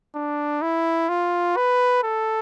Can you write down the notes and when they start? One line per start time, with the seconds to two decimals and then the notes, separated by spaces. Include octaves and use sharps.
0.15 D4
0.62 E4
1.09 F4
1.56 B4
2.03 A4